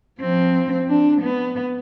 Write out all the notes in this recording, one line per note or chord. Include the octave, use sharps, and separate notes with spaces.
F3 C4
D4
B3